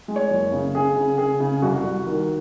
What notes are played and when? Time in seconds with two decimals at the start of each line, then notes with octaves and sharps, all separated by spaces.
0.08 G#3
0.16 C#5
0.31 F#1
0.52 C#3
0.75 C#3 G#4
0.96 C#3
1.18 C#3 G#4
1.40 C#3
1.62 C2 F#4
1.84 C2
2.06 D#3